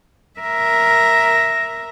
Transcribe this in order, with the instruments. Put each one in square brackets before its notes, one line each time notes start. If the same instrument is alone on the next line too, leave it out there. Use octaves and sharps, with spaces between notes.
[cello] A#4 E5